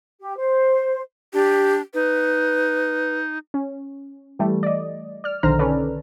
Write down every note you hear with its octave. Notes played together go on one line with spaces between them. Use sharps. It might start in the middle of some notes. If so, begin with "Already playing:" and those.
G4
C5
D4 G4
D#4 B4
C#4
E3 G3 A3
D5 D#5
D5 F6
B1 D3 D#3 C5 A#5 F6
C#4 A4 B4 D5